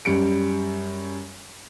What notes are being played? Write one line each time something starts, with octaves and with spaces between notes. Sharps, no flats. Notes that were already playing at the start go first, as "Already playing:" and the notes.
F#2 G3 C#7 D7